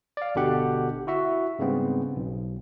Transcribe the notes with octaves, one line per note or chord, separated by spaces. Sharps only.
D5 F5
G1 B2 D3 G4 F#5
E4 F#4 E5
G#2 C#3 G3 B3 C4
B1